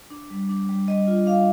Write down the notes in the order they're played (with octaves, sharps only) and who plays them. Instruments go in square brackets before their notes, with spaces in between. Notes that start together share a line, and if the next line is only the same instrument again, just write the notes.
[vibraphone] D4
G3
D4
G3
G3 D#5
F4
D4 F5